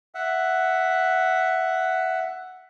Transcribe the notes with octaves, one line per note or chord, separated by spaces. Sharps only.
E5 F#5